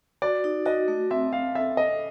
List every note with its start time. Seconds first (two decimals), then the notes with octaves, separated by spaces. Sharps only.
0.22 F#4 D5
0.44 D#4
0.66 F#4 D#5
0.88 A3
1.11 C4 E5
1.32 C4 F5
1.55 A4 E5
1.77 A4 D#5